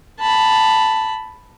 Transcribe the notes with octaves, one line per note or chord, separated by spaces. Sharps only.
A5 B5